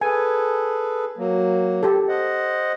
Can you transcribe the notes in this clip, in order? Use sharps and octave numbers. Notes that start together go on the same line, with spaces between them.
G#4 A4 B4 G#5
F#3 A#3
G4 A4
C5 D#5 F#5